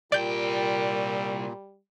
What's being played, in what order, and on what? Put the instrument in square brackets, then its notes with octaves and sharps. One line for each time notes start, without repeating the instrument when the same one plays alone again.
[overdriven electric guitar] C2 G5 [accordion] A#2 [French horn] G3 [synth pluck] D5 G6